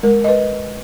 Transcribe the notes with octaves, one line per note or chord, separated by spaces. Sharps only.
G#3 A#4
B4 D#5